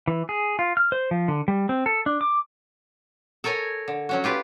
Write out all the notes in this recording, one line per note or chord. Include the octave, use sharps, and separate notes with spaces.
E3
G#4
F4
F6
C5
F3
D3
G3
C4
A4
D4
D6
A4 A#4 C#5 G#5 A#5
D3
F#3 C#4 F#4
F4 G4 B4 D5